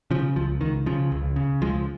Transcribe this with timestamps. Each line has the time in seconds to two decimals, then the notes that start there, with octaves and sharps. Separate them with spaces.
0.11 C#3 F3
0.36 C#2 F3
0.61 C#2 D#3
0.86 C#3 F3
1.12 C#2
1.36 C#3
1.61 C#2 F3 G#3